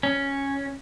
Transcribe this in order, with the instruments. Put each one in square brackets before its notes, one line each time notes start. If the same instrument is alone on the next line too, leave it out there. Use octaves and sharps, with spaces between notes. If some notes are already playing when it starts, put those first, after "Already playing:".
[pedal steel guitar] C#4